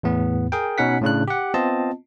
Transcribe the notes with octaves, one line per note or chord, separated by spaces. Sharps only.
E2 A2 B3
G#4 A#4 G5
B2 C#4 D#4 F#5 B6
A2 C#3 D4 F#6
G4 F#5
B3 C4 F4 D#5 A5